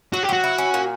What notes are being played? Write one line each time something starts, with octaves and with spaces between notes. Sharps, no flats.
F#3 F#4
G4
F#3 F#4
E4
C#4
A#2